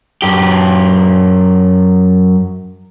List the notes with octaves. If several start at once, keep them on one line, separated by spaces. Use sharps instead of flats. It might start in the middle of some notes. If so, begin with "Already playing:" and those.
F#2 G4